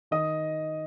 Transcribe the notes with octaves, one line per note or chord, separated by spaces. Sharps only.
D#3 D#5 D#6